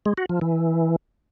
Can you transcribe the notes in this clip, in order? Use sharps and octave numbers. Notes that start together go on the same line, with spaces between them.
G#3
F#4
F3
E3